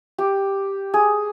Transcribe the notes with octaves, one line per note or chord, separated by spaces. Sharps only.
G4
G#4